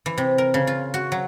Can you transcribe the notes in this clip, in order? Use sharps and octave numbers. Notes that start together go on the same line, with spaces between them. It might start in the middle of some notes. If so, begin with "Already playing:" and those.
E3
C3
A#4
C#3
F4
F#4
F#3